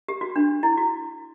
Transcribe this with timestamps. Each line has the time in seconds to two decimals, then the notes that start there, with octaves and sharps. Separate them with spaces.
0.08 G4
0.21 F#4
0.36 D4
0.63 E4
0.77 F#4